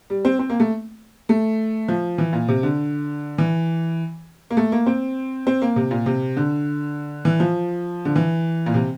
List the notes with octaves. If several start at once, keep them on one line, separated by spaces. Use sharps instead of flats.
G3
C4
C4
A#3
A3
A3
F3
E3
A#2
C3
D3
E3
A#3
A3
A#3
C4
C4
A#3
C3
A#2
C3
D3
E3
F3
D3
E3
A#2
C3